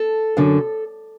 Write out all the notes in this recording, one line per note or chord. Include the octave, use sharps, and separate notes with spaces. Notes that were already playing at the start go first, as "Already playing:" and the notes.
Already playing: A4
F#2 D3